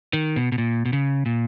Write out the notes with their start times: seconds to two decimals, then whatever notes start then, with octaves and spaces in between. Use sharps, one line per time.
0.13 D#3
0.36 B2
0.52 B2
0.58 A#2
0.85 B2
0.93 C#3
1.26 A#2